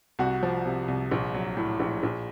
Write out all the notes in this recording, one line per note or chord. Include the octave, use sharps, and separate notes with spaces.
C2 F#4
F3
C3
C2
A#1
F#3
A2
A#1
A#1